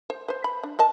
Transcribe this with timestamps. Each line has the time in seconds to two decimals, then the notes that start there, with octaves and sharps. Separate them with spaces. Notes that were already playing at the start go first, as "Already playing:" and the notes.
0.10 C5
0.28 B4 C5
0.44 B5
0.63 D4
0.79 A#4 D#5 A5